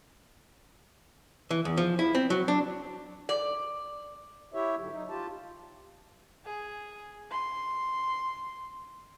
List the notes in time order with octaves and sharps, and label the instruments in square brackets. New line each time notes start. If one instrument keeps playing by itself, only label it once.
[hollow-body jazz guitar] E3
E2
F3
E4
C4
F#3
D4
[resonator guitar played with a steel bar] D5
[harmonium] E4 G4 C#5 E5
G#2 D3 F#3
D#4
F4 G4 A5
[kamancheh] G#4
C6